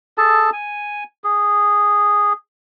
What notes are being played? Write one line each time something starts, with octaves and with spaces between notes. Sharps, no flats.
G#4 A4 A5
G#5
G#4